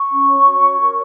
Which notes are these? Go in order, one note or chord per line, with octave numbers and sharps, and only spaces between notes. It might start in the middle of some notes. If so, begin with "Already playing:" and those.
Already playing: C#6
C#4
C#5
F#4
C#5
A#4